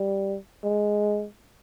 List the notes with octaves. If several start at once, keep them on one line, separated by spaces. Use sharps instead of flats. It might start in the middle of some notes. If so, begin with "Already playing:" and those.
Already playing: G3
G#3